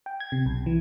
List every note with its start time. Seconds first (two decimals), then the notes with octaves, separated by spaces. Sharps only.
0.06 G5
0.20 G#6
0.32 C3
0.46 B1
0.66 E3